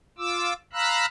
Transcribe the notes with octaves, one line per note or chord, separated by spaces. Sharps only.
F4 D6 E6
F5 A#5 B5 E6 F#6